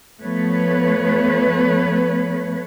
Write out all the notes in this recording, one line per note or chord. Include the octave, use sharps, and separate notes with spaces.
F3 A3 B3 B4 C#5